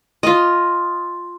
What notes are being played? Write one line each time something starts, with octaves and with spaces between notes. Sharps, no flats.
F4 D#5